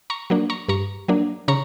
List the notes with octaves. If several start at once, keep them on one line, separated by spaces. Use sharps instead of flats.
A#5 C#6
F#3 A#3 D4
A#5 C#6
G2 A#5 C#6
F#3 A#3 D4
C#3 A#5 C#6